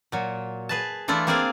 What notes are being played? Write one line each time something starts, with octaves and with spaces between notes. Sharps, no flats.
A#2 F#3
G#4 B4 A5
E3 A3 D4 E4 F4
A#3 C4 G#4 D5 F5 G#5